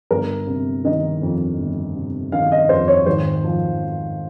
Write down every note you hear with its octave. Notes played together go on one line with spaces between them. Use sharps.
G1 A#4
C3
D#3 D#5
F2
G1
C3
D#3 F5
D#5
F2 C5
C#5
G#1 C5
F3